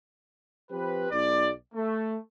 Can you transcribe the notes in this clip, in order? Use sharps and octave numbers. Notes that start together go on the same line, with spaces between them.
F3 C4 G4 B4
B1 D5
A3